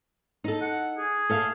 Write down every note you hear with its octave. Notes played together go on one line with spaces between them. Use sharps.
D#4 A4
F#5
G#4
A4 E5 F5